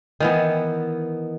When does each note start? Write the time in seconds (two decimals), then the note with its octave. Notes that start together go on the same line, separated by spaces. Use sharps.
0.20 D#3 E3 B3